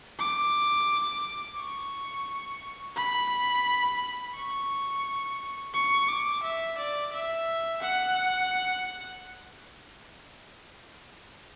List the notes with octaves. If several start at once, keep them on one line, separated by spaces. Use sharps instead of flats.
D6
C#6
B5
C#6
C#6
D6
E5
D5
E5
F#5